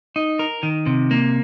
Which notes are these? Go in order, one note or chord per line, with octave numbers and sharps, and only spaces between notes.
D#4
A#4
D#3
C3
A#3